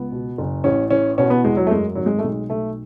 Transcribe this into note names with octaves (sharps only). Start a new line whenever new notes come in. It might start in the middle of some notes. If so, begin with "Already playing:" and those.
Already playing: C#2 B3
B2
F#1
A1 C#4
E3 C#4
B2 C#4
B3
E2 G#3
F#3
A3
F#2 G#3
G#1 F#3
G#3
A3
B1 G#3
B1 A3